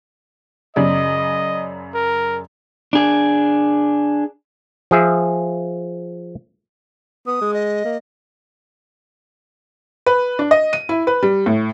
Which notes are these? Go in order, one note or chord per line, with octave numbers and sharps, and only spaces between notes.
F#2 C#3 D5 D#5
A#4
D4 G#4
F3 G#4 E5
B3 D#6
G#3
D#5
A#3
B4
D4
D#5
D#7
E4
B4
G3
A2